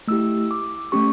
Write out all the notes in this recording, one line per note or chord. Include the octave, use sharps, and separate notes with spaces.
A3 E4 G4 E6
D6
A3 C#4 G4 C#6